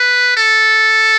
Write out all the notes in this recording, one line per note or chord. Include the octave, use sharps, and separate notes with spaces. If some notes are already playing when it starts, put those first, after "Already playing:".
Already playing: B4
A4